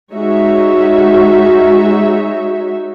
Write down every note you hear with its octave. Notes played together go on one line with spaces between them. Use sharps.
G#3 D#4 F#4 C#5 E5